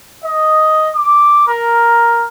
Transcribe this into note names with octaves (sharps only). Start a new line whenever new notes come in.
D#5
D6
A#4